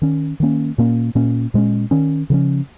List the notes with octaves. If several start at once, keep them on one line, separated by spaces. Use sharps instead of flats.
D#3 C#4
D#3 A#3 C#4
A#2 A#3 C#4
A#2 A#3 C#4
A#2 G#3 C#4
D#3 C#4
C#3 F3 C#4